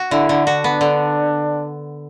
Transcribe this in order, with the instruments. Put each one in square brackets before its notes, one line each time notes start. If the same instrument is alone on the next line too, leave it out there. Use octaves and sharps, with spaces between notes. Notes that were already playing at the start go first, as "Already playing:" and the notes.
Already playing: [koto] F#4
[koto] D3 [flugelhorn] E4
[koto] D3
[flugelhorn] D4 [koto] F#4
[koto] B3
D3